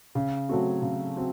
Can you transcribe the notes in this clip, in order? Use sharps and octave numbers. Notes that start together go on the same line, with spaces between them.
C#3
F#3 A3 C4 F#4
C#3
C4 F#4